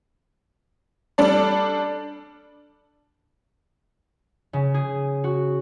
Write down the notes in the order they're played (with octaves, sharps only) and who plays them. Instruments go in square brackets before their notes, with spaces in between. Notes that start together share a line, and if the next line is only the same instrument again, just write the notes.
[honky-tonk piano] G3 D4 A4 D5
[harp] C#3
G#4
F#4